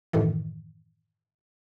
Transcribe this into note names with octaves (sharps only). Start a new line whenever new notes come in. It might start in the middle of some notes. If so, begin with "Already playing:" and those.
F#2 A2 D#3 E3